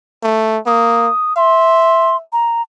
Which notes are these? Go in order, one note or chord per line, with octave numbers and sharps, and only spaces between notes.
A3
A#3 D#6
E5 C6
A#5